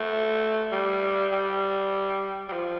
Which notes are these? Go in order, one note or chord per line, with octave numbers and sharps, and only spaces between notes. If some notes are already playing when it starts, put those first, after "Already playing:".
Already playing: A3
G3
G3
G3
F3